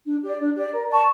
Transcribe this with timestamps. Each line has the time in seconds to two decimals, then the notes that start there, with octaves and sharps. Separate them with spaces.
0.06 D4
0.22 G4 D5
0.39 D4
0.55 G4 D5
0.72 A#4
0.89 D5 A5 C#6